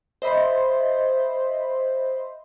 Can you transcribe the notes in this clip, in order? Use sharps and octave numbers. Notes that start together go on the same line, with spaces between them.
C5 D#5 E5 B5 C6